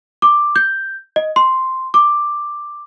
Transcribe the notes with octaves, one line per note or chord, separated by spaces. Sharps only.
D6
G6
D#5
C6
D6